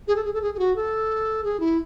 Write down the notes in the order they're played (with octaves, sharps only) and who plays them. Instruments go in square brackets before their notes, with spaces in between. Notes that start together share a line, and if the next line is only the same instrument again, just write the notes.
[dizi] G#4
A4
G#4
A4
G#4
G#4
F#4
A4
G#4
E4